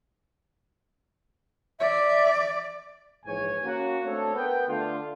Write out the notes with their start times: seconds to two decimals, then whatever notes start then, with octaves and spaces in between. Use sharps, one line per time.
1.80 D5 E5
3.25 A#1 G#2 E3 C#5 G#5
3.64 A#3 C#4 F#4
4.05 A3 C4 D4 A4 C#5
4.35 B3 A#4 F#5 G5
4.68 D3 A3 D4 F4